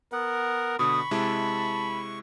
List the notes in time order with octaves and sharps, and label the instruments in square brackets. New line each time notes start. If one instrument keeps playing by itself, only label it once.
[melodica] B3 F#5 [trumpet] A#4
[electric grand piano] B2 D3 [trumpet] B5 [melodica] C#6 [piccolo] D#6
[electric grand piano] C3 G#3 E4 [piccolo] A5